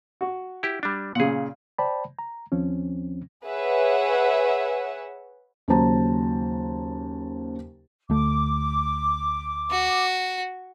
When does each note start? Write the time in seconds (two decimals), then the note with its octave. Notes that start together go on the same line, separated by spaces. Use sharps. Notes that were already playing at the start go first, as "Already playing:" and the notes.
0.21 F#4
0.63 E4 G4
0.83 G3 D4
1.15 A#2 C#3 G#4 F#5
1.78 C5 D5 G5 A5 B5
2.19 A#5
2.52 D#2 F3 C4 C#4
3.47 G#4 B4 C#5 E5 F#5 G#5
5.68 D#2 C#3 F#3 C5 A5 A#5
8.10 D2 A3 D6
9.71 F#4